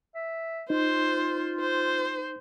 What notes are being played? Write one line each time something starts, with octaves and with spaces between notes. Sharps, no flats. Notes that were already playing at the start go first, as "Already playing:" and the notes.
E5
D#4 F4 C5
C5